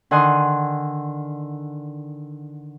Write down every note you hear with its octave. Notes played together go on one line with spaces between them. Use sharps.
D3 D#3 F#5 G#5 C6 D#6